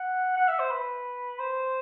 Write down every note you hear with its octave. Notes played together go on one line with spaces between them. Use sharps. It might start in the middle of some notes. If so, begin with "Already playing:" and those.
Already playing: F#5
F#5
E5
C5
B4
C5